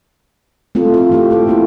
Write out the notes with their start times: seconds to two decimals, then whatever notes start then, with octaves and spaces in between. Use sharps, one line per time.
0.75 A3 C4 F4 A4
0.94 C4 F4
1.10 E3 F4 G4
1.31 A3 A4
1.47 A#3 E4 F#4